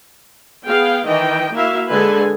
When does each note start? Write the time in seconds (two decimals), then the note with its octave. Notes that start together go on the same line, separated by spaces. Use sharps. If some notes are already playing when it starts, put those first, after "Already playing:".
0.65 B3 G#4 F5 G5
1.06 D#3 E3 D#5 G5
1.53 A#3 E4 F#4 E5 F5
1.89 D3 G#3 G#4 A4 B4 G#5